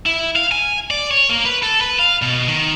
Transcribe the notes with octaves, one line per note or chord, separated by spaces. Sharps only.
E4
F5
G#5
D5
C#5
A#3
B4
A4
B4
F5
B2
D#3